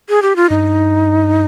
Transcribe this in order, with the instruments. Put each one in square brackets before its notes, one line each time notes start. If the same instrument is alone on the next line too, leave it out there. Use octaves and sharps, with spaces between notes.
[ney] G#4
G4
F4
[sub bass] G2 [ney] D#4